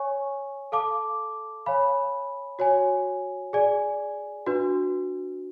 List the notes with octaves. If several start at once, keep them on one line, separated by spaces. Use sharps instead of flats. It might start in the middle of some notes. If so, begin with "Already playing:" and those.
Already playing: C#5 G#5 C#6
A4 F5 A5 D6
C#5 F5 G#5 B5
F#4 C#5 G#5
G#4 D5 G#5
D4 F#4 B4